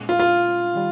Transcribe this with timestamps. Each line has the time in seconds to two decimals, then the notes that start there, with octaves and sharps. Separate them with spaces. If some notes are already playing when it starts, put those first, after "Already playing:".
Already playing: A#2 G#3 C#4
0.09 F4
0.19 F4
0.75 D#3 G3